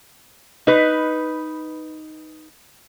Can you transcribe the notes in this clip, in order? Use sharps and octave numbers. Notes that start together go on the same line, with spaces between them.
D#4 B4